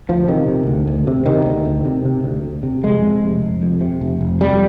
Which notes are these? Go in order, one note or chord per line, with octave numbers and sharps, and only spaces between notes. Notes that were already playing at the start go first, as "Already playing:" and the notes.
D2 F3
C3 D#3
C3
D2
D2
C3
C3 D#3
D2
D2
C3
C3
D2
D2
C3
F2 G#3
C3
F1
F1
F2
C3
F1
F1
F2 G3